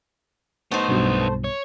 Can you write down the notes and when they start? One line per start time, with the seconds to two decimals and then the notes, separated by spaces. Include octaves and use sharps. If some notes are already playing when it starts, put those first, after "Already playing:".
0.72 A3 B3 D#4 A4 C5
0.88 B1 G2 B2
1.44 C#5